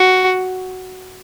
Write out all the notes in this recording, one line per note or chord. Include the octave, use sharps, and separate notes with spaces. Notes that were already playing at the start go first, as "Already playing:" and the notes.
Already playing: F#4